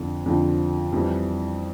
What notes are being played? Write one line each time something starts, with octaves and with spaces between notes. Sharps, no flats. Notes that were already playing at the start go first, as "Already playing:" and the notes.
Already playing: F2 D3 F3
F2 D3 F3
F2 E3 G3